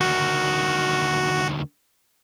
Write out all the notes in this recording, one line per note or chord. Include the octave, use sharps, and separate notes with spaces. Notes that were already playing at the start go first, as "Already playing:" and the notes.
D2 D#3 F#4